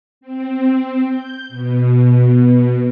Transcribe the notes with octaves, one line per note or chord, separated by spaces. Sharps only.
C4
G6
B2